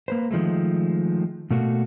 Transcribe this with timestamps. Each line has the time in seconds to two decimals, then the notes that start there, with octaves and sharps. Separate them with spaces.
0.08 A#3 B4 C5
0.31 D#3 F3 G#3 A3
1.51 B2 A3 A#3 F#4